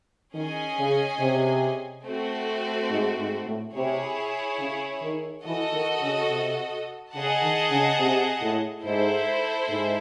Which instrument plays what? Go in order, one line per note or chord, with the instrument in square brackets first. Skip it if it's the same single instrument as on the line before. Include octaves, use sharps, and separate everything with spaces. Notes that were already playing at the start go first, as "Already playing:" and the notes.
[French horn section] D#3 [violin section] C#4 G#4 D#5 G#5
[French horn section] C#3
C3
[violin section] A3 C4 F#4
[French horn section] G#2
G#2
A2
[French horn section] C3 [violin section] E4 G#4 C#5
[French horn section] C#3
D#3
[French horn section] E3 [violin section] F#4 A4 D#5
[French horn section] D#3
C#3
C3
[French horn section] C#3 [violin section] G#4 D#5 F#5 A5
[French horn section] D#3
C#3
C3
A2
[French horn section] G#2 [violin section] E4 A4 C5 E5
[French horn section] G#2